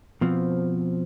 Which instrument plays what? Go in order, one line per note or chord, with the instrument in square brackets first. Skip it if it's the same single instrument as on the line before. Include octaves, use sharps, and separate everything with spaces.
[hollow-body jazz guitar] B2 F3 C4